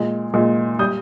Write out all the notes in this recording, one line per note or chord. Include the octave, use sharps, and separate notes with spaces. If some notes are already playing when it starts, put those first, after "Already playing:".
Already playing: A#2 G#3
A#2 G#3
G3 D#6 G6